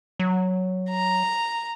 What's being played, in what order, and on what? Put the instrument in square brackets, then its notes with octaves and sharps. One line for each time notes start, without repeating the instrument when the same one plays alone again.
[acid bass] F#3
[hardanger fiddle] A#5